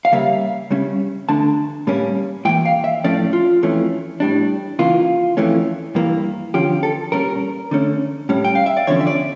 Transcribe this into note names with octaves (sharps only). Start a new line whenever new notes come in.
F5
C#3 G3 A#3 E5
C#3 G3 C#4
D3 A3 D4 A5
A2 G3 A#3 C#4
A2 E3 A#3 G5
F5
E5
A2 F3 A3 C#4 D5
F4
F2 E3 A3 C#4
A2 G3 D4
C#3 E3 A#3 F4
F2 E3 A3 C#4
G2 E3 A#3
D3 F3 C#4 G4
A4
A#2 G3 C#4 A#4
D3 A3 C#4
A2 G3 C#4
G5
F5
E5
D5
E2 D3 F3 C#4 C#5
E5
D5